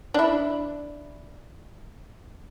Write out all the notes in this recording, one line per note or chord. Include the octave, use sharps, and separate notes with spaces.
D4 E4